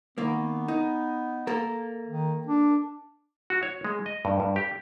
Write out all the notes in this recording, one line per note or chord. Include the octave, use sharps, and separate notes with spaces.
D#3 A#3 B3
D#4
A#3 A4 A#4
D#3
D4
F#4
C#5
G#3
D#5
G2
G2
G4